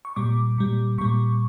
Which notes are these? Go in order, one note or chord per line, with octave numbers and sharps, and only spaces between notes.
C#6
A#2 G3 D6
A#2 G3
A#2 G3 C#6